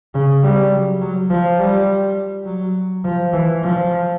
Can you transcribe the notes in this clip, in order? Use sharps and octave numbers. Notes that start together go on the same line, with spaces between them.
C#3
G3
F#3
F#3
F3
G3
F#3
F3
E3
F3